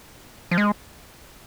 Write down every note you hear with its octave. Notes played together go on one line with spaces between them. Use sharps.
F3
G#3